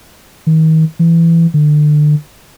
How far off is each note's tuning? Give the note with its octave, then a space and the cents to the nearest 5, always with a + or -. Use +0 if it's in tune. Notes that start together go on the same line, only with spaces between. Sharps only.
D#3 +35
E3 +15
D3 +30